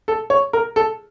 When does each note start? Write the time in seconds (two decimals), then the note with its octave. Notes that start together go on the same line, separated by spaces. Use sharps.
0.08 A4
0.30 C#5
0.53 A#4
0.76 A4